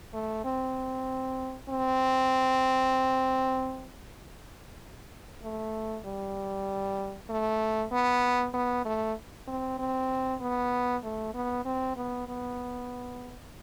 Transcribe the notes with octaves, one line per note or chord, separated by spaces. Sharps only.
A3
C4
C4
A3
G3
A3
B3
B3
A3
C4
C4
B3
A3
B3
C4
B3
B3